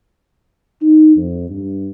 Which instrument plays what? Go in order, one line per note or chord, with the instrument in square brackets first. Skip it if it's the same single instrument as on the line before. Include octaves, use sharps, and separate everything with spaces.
[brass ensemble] D#4
F2
G2